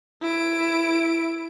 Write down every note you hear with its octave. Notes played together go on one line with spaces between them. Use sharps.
E4 D7